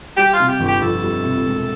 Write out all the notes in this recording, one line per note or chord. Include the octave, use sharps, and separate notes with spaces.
G3 G4
F4
C3
G4
G1
G4
F2 A4
G3
C3
E1